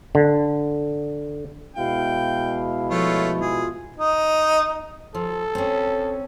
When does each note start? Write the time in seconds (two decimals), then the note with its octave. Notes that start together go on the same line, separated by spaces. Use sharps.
0.15 D3
1.76 B2 G#3 E4 F5 G5
2.91 F3 A3 F4 C#5
3.41 F4 G#4
3.96 D#4
5.15 F3 A4
5.55 C4 C#4